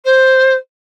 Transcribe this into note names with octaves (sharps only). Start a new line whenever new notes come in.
C5